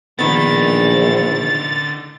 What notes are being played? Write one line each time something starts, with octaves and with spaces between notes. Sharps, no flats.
A#1 D3 D#3 B3 D#4 A6